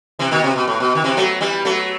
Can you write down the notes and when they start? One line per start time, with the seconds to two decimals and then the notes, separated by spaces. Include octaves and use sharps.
0.19 C3 E3
0.31 B2 D#3
0.44 C3
0.56 B2
0.68 A2
0.80 B2
0.95 D#3
1.04 C3 E3
1.17 F#3 A3
1.41 E3 G3
1.65 F#3 A3